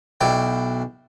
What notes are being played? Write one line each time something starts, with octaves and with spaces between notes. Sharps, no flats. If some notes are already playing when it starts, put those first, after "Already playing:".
B1 B2 E4 D5 G5